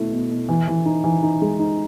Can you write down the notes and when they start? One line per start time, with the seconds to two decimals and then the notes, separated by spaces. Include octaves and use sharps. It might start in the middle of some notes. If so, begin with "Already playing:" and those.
Already playing: B2 A3 E4
0.11 B2
0.31 B2
0.49 E3
0.68 E3
0.86 D#4
1.04 E3
1.23 D#4
1.42 G#3
1.59 D#4